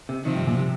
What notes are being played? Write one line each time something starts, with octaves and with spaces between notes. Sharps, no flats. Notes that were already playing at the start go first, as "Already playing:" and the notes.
C3
C3 D#3 F3
G2
A#2
C3